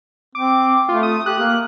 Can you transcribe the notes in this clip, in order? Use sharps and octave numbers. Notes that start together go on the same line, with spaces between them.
C4 D6
A3 F4
D#6
G4 F#6
A#3